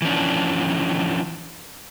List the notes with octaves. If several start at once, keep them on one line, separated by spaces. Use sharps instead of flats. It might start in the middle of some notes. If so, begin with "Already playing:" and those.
E3 F3 C#4 D4